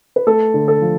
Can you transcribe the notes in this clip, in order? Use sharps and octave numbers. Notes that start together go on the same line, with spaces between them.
B4
A3 A4
D3
A4
F3